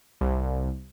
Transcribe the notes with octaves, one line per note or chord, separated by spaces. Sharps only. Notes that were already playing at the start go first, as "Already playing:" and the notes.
C2